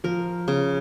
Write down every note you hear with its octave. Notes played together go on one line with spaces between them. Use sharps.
F3 A#4
C#3